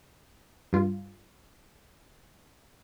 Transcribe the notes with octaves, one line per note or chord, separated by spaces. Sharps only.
G2 F4